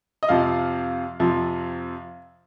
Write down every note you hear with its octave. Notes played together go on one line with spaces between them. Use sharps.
D#5
F2 C3 F3 F5
F2 C3 F3